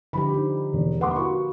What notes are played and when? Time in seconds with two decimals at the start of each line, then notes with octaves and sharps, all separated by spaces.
0.13 D3 F3 G4 B5
0.34 D#4
0.73 E1
1.01 A#3 B4 F#5 C6 D6
1.16 F#4 C#6